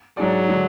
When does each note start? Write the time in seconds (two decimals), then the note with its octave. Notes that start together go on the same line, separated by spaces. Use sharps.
0.17 G#2 F#3 G#3 D4 G#4 D5
0.48 D3 G#3 D4